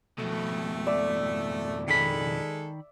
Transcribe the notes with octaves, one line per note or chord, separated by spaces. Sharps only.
F2 B2 A3
D5 E5
D#3 G#3 A4 B5